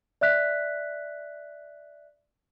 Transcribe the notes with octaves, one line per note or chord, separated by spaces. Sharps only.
D5 E5 F#6 B6